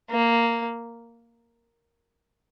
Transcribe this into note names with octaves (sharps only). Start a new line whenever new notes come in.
A#3